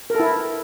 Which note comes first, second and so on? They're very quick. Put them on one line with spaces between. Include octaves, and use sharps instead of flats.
A#4 A4 E4